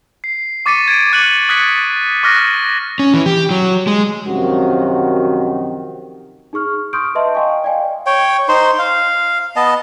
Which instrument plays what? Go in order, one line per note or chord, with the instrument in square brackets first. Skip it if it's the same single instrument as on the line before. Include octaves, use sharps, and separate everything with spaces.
[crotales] C7
C#6 D6 A6 B6 C#7 D#7
G#6 A6 D7 D#7
D6 F#6 C#7 D#7 F#7
D#6 F#6 G#6 A6 B6 C#7
C#6 D6 F6 F#6 A#6
[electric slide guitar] C#4
E3
G4
F#3
G#3
[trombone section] F#2 C3 D#3 F3 F#4
[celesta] D#4 G#4 C#6 F6
C6 C#6 D#6 F6 G6 D7
B4 D#5 E5 A5 C6
D#5 F5 G5 G#5 C#6
D5 D#5 F5 G5 G#5
[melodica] C#5 G5
D#4 C5 C6
F5
B3 D#5 A5